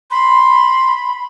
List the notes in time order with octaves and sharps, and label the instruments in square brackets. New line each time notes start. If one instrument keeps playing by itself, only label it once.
[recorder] B5 [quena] C6